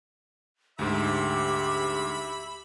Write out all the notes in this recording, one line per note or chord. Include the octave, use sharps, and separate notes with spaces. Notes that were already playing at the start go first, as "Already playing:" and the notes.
D2 G#2 G4 E5 B5